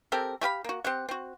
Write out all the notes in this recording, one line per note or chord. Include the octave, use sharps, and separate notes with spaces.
C4 G4 A4 A#4
A3 G4 F5 B5
A#3 F#4
C4 G4 F#5
C4 F#4